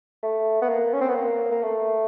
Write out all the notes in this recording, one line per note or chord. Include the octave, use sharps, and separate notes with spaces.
A3
B3
A#3
C#4
C4
B3
A#3
A#3
A3